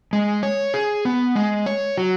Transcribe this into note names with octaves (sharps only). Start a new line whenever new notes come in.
G#3
C#5
G#4
B3
G#3
C#5
F#3